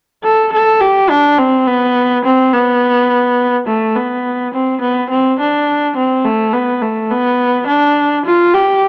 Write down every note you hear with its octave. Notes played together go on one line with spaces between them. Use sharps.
A4
A4
G4
D4
C4
B3
C4
B3
A3
B3
C4
B3
C4
D4
C4
A3
B3
A3
B3
D4
F4
G4